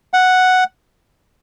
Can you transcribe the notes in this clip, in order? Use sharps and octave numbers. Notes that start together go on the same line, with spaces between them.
F#5